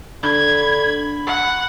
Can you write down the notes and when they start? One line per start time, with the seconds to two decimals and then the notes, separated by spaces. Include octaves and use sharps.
0.23 D3 B5 G#6
1.26 F#5